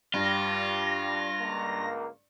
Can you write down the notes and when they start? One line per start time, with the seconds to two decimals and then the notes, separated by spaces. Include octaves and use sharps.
0.14 G2 G3 F4 A#6
1.39 C#2 A#3